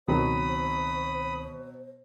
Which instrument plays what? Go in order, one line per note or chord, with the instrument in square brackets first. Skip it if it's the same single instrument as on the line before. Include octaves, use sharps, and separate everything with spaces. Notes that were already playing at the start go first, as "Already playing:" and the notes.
[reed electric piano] C#2 D#3 C4 [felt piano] B2 F#3 [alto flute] C5 [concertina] B5 D#6